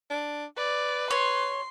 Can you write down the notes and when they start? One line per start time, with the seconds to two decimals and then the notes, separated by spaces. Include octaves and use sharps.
0.10 D4
0.57 B4 D5
1.11 C#5 C6